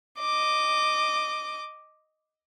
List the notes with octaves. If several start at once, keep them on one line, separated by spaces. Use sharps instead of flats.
D#5 D6